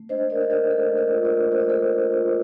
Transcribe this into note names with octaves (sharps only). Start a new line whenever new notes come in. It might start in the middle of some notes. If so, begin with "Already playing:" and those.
Already playing: A3
D4 C5 D#5
D4 A#4 D5
D#5
D4 A#4 D5
A3 A4 C5
A3
A#4 D5
F4
A#4 D5
A3
A3 C5
D5
A3 A4 C5
A3
F4